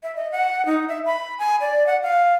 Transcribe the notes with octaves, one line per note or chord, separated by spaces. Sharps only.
E5
D#5
F#5
D#4
E5
B5
G#5
D5
F#5
F5